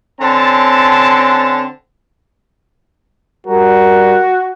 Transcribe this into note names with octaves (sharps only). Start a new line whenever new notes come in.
D3 C4 C#4 A5
G3 F#4 A#4